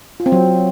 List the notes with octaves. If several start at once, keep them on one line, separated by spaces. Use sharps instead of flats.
F4
C4
F#3